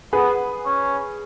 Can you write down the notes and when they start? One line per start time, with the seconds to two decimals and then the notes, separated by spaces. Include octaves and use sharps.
0.13 B3 G#4 B4
0.66 C#4